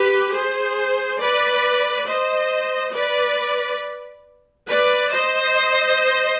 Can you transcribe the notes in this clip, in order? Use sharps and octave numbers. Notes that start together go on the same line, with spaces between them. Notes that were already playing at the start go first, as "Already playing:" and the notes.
Already playing: G4 B4
G#4 C5
B4 D5
C5 D#5
B4 D5
B4 D5
C5 D#5